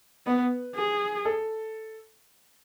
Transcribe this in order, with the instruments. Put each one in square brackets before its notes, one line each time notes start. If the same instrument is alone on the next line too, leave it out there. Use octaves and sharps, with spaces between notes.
[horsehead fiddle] B3 [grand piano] B4
[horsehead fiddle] G#4
[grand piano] A4